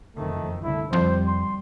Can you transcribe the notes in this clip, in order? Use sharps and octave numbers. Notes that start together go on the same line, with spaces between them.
F#1 F2 D#3 A3
C2 D3 A3 E4
F2 G3 C5
C6